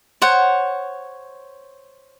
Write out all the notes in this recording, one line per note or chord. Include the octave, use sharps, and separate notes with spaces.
C5 C#5 F#5